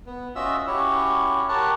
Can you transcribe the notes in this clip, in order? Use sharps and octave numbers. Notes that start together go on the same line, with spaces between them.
B3
C#4 F4 F#4 D#5 E5 E6
C#4 E4 F#4 G4 C#5 C#6
G4 A#4 C#5 F#5 A5